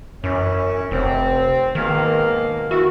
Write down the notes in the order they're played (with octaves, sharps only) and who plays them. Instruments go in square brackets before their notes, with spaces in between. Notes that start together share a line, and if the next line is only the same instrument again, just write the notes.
[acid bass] F#2 [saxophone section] E3 C#4
[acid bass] F1 [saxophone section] C4
[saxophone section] G#2 B2 A#3 [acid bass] D#3
[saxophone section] E4 [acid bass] F#4